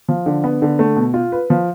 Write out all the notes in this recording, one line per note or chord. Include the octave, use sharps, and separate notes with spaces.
F3
D3
B3
D3
A3
B2
F4
B4
F3